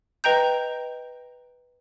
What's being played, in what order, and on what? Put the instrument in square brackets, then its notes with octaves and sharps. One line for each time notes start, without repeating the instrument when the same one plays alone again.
[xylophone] B4 D#5 G5 A#5 G6